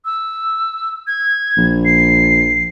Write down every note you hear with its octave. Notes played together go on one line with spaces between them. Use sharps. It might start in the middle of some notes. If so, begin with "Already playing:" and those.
E6
G#6
A#1
C7